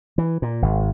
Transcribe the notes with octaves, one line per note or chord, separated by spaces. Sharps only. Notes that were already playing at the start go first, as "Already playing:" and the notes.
E3
A#2
G#1